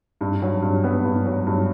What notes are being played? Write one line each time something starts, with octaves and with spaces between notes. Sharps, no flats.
G2
F#3
G2
B3
G2
F#3
G2